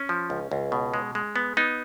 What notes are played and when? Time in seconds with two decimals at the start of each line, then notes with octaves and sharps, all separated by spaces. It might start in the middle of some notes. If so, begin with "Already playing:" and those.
Already playing: C#4
0.09 F3
0.30 C#2
0.52 C#2
0.72 B2
0.94 G#3
1.15 G#3
1.36 B3
1.57 B3 D#4